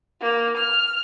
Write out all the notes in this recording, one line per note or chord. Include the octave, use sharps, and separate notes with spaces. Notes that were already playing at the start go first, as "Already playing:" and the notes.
A#3
F6